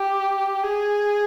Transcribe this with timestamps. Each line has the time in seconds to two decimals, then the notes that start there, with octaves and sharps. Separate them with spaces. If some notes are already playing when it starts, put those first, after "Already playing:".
Already playing: G4
0.64 G#4